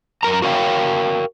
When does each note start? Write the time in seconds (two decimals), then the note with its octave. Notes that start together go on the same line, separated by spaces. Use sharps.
0.23 F#2 A#4 A#5
0.42 F#4 A#4 C#5 E5 F5 G5